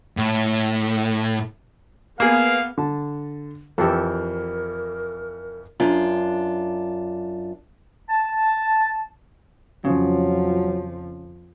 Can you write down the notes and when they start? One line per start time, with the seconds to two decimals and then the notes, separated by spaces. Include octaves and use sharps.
0.17 A2
2.20 A#3 B3 G#4 F5
2.78 D3 A5
3.78 F2 E3 G4 A4 A#4
5.80 F#2 D4 F4
8.10 A5
9.85 F2 C#3 F3 F#3